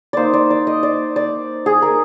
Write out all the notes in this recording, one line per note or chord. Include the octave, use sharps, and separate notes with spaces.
A#3 D#4 C5 D5
D5
D5
D#5
D5
D5
G#4
A#4